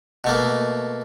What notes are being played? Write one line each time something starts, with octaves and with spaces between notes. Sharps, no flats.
B2 A3 A#3